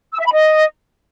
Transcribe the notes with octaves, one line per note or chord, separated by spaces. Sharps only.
E6
E5
B5
D#5